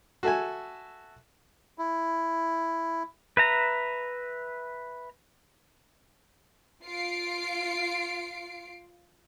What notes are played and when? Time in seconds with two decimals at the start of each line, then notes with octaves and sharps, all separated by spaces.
0.23 F#4 A4 E5 G#5
1.78 E4
3.37 B4 E5 A#5
6.85 F4 C7 D7